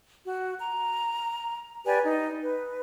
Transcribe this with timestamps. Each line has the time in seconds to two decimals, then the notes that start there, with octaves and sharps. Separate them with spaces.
0.24 F#4
0.58 A#5
1.86 G4 B4 D5 G#5
2.04 D#4
2.42 B4